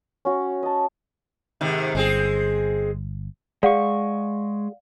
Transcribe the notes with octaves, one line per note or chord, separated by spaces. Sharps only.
C#4 F#4
D#5 A5
G#2 C3 D#3
G1 G#3 C4 G#4
G#3 G#4 D5 F5 F#5 C#6